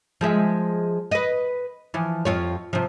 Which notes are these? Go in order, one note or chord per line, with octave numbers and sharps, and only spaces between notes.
F3 G#3 E5
B4 D#5
E3 F3
F2 F4 C#5
C3 F3